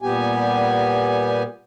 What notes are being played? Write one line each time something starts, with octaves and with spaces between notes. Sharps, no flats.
A#2 G3 B3 G4 G#5